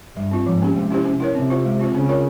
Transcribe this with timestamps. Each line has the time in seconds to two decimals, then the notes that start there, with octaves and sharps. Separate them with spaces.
0.17 G2 G3
0.31 C4 F4
0.46 G#2 F3
0.62 A#3 C#4 G4
0.76 C3 G#3
0.91 C#4 E4 G4 C5
1.05 C#4
1.20 E4 A#4 C#5
1.35 C3 C4
1.50 F4 C5
1.65 G#3
1.79 C4 F4 C5
1.95 C#3 C#4
2.09 F4 A#4 C#5